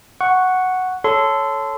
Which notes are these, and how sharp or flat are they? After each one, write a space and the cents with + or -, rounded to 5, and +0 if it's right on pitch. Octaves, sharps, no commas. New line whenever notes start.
F#5 +0 C#6 +0
A4 +0 C#5 +0 C6 -25